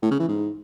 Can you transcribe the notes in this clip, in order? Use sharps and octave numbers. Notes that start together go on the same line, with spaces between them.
A2
C#3
E3
G#2